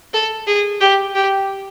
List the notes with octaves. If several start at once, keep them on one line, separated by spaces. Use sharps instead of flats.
A4
G#4
G4
G4